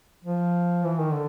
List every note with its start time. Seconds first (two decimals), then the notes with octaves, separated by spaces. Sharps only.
0.24 F3
0.85 E3
0.99 D#3
1.13 D3